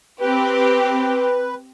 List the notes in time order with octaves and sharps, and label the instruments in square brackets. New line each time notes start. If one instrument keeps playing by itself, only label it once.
[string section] C4 G4 [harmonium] B4